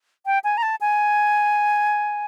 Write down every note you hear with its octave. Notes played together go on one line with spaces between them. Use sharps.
G5
G#5
A#5
A5
G#5